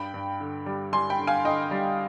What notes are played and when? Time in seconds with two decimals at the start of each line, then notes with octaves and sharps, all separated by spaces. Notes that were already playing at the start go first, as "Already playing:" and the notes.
Already playing: G2 G5 B5
0.14 G2
0.40 D3
0.66 G3
0.93 G3 G#5 C6
1.10 G5 B5
1.19 D3
1.27 F5 G#5
1.45 D3 D#5 G5
1.71 G3